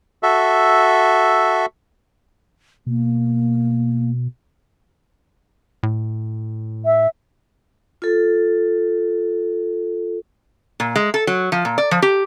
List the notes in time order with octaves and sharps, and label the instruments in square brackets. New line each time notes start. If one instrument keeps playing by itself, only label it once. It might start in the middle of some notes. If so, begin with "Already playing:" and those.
[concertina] F#4 A4 E5
[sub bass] B2 [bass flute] A#3
[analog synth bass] A2
[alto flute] E5
[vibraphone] F4 A4
[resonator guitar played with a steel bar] A#2
G#3
A4
F#3
F3
A#2
D5
F3
G4